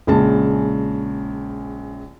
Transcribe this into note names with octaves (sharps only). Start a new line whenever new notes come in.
A#1 C#3 G#3 A5